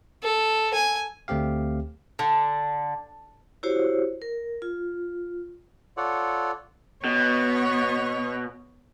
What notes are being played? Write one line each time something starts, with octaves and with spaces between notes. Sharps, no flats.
A4
G#5
D2 A3 C4 G4 F5
D3
E4 F#4 G4 C5 C#5
A#4
F4
F4 A4 C#5 D5 F#5
B2 B3 C#5